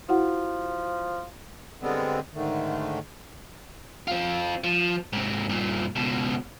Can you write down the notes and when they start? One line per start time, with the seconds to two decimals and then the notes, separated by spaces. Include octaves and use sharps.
0.09 F3 E4 F#4 F#5
1.82 D3 G3 G#3 B3 C4
2.34 G#2 D3 D#3 A3
4.08 C4 F4
4.64 F3
5.13 G#2 C3
5.49 G2 A#2
5.96 C#2 B2